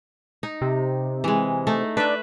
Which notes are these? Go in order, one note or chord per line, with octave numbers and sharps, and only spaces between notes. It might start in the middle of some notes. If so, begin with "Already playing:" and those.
D#4
C3
E3 G#3
A3 D#4
D4 B4 E5